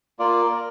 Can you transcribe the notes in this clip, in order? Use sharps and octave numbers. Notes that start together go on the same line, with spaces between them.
A#3 F4 D5
A#4